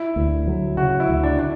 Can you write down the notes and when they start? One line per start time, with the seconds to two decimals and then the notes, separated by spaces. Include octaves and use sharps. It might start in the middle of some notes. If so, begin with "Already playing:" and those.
Already playing: E4
0.16 D2
0.47 F#3
0.77 C#3 F#4
1.00 E4
1.08 D2
1.24 D4
1.39 D4